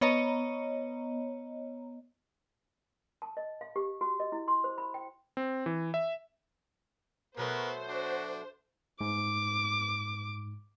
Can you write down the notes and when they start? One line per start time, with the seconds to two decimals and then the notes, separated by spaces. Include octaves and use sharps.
0.01 B3 C#5 D#5 A#5
3.22 A5
3.37 D#5
3.61 F5
3.76 G4
4.01 F#4
4.20 D#5
4.32 E4
4.48 C6
4.64 C5
4.78 B5
4.94 G5
5.37 C4
5.66 E3
5.94 E5
7.37 B2 F#3 A3 B3 A#4 C5
7.89 D4 F#4
9.01 G#2 D6